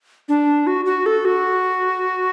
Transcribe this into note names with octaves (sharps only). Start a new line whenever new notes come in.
D4
F#4
F#4
A4
F#4